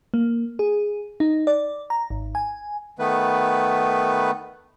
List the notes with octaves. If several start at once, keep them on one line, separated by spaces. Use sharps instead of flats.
A#3
G#4
D#4
D5
A#5
G#1
G#5
D#3 A3 B3 B4